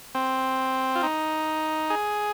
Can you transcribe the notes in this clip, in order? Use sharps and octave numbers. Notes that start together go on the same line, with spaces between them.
C4
F4
D#4
G#4